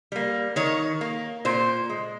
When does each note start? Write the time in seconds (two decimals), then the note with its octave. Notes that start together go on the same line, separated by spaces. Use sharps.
0.12 G3 A#3
0.56 D#3 C#5
1.01 A#3
1.45 A#2 C5
1.90 G#3